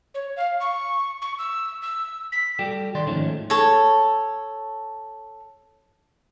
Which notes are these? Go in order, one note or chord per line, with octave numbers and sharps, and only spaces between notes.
C#5
F5
C#6
C#6
E6
E6
B6
G3 F#4 G4 A4
D#3 A4 D5 C6
G#2 D#3 F3 G#3 A3 C#4
A4 C#5